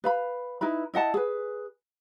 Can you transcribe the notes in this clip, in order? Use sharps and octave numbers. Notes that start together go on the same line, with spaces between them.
B4 F5 B5
D#4 E4 B4 B5
E4 D#5 F#5 A5
G#4 B4